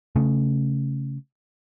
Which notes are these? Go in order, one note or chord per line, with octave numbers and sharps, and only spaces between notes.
C#3 A3